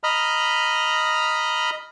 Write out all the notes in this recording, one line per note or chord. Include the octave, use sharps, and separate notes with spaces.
D#5 A#5 B5 F6